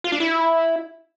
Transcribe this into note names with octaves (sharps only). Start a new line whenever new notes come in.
F4
D4
E4